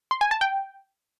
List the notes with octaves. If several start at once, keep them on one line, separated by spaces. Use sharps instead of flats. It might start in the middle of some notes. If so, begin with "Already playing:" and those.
C6
G#5
A5
G5